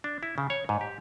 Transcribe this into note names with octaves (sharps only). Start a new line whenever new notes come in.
D4
E4
C#3
C#5
G#2
G4